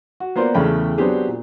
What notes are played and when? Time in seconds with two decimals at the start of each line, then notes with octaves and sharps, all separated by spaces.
0.20 F#4
0.36 A#3 B3 F4 C5 D5
0.54 E2 C#3 A3 G5 B5
0.98 F#3 B3 C4 D4 G4 G#4
1.28 A#2